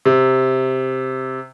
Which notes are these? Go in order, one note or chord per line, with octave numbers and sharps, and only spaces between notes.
C3